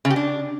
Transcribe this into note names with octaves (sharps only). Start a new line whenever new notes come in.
C#3
G4
D4